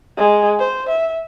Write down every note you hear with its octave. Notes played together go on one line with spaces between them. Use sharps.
G#3
C5
E5